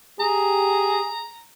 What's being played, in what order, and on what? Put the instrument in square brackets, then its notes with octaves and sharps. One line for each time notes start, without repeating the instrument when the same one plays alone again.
[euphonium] G4 [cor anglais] G#4 [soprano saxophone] A#5